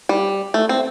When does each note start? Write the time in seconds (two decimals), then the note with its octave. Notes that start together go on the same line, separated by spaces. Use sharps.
0.09 G3
0.54 A3
0.69 C4